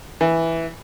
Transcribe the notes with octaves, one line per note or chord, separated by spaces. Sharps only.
E3